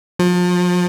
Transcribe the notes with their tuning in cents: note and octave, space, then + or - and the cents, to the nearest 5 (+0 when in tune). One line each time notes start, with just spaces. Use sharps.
F3 +35